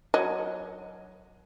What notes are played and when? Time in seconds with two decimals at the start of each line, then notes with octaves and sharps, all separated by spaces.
0.14 F#3 D#5